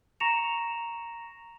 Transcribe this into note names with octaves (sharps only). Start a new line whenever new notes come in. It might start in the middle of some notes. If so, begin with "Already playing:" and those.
A#5 C#6 A#6 C#7 E7 F7